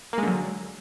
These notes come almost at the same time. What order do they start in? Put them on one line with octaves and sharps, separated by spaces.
A#3 G#3 D3 F#3